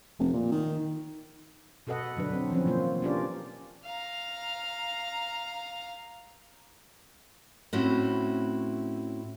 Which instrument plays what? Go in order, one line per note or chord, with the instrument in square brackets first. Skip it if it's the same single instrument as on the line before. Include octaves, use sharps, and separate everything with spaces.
[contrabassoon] F1
A#2
D#3
[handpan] B2 F#4 A4 B4 D#5 F#5
D3 F#3 D4 B4
F#3 C4
E3 F3 C4 C#4
B2 A#3 F4 C5
C#4 D4 F4 G4 A#4 D5
[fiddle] F5 A#5
[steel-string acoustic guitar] A2 C4 C#4 E4 F#4